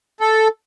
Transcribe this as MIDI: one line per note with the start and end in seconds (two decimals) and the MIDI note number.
0.21 0.48 69